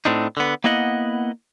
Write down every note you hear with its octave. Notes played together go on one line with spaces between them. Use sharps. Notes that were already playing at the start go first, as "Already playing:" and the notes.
A2 C4 D4 D#4
D3 B3
A#3 B3 E4 D#5 F#5